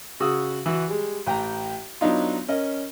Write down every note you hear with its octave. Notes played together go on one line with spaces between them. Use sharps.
C#3 F#4 D#6 E6
E3 F#4 E6
G3 G#3
A1 G5 A#5
F#3 B3 D4 D#4 F4
C#4 A#4 D#5